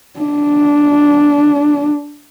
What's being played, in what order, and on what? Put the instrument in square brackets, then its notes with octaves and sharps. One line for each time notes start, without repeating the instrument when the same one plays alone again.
[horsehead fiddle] D4